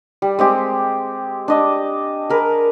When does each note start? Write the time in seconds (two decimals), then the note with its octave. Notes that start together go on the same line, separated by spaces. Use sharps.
0.22 G3
0.39 G#3 C4 G4 G#4
1.48 D4 D#5 D6
2.30 G#4 A#4 B4